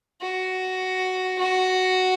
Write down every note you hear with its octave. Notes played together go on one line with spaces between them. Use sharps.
F#4
F#4